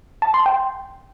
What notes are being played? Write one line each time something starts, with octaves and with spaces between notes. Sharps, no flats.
A5
C6
G5